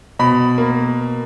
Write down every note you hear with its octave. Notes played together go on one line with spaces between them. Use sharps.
B2 B5
A#3